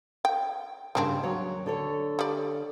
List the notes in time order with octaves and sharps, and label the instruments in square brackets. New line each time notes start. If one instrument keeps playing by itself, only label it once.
[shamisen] G5
[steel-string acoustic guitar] G2 C#3 G3 [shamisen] A#3 C4 D4
[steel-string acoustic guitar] D#2 F#3 C#5
D3 A4 C#5
[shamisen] G3 D5